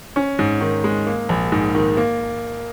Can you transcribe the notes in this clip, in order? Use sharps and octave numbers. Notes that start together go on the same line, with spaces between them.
C#4
G#2
D#3
G#3
A#3
A#1
G#2
D#3
A#3